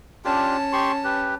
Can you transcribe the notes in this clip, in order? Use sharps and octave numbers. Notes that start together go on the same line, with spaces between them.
C#4 D4 F4 G4 A5
G4 C6 C#6
G4 B4